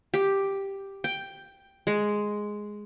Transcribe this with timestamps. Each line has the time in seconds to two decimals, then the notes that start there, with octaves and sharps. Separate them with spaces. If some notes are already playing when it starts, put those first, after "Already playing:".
0.14 G4
1.04 G5
1.87 G#3